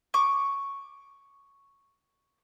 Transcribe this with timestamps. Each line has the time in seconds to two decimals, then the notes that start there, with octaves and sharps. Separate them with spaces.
0.14 C#6 D6